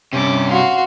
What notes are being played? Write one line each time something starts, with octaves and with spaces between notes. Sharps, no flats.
G2 C3 C#4 D6
F#4 F5 C6